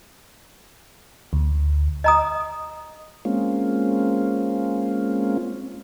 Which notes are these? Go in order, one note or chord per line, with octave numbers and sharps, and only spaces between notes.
D2
D#5 A#5 D#6
G#3 A#3 C4 C#4 F4